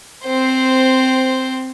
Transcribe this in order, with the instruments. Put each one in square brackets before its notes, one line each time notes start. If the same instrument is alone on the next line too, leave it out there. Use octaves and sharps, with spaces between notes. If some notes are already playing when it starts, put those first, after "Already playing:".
[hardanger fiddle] C4 C5